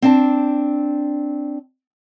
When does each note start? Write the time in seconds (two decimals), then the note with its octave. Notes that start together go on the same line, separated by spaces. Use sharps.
0.02 C4 D4 A5